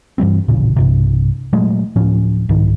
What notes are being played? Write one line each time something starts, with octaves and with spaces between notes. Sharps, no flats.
G2 E3 G3 C4
D1 A1 A#2 C#3
B1 G2 C3
A#2 F#3 G#3 A3
D1 A2 F3 C#4
C2 G#2 D#3